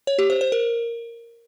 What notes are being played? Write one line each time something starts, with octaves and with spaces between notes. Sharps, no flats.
C#5
G4
C5
C5
A#4